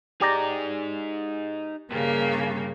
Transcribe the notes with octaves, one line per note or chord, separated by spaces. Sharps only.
D#4 G4 G#4 D5 A#5
G2 C#3 A#3